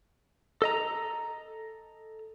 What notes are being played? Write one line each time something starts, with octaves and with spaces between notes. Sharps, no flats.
A4 D#5 A#5